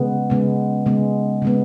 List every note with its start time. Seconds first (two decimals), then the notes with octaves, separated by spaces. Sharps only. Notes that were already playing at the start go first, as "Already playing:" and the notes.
Already playing: C#3 G#3 B3
0.30 C#3 G#3 B3
0.86 C#3 G#3 B3
1.42 C#3 G#3 B3